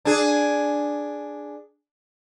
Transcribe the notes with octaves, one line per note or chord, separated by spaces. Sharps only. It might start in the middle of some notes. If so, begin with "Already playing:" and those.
D4 G#4